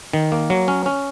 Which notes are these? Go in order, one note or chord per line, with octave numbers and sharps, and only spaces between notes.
D#3
A#3
F#3
C#4
C#4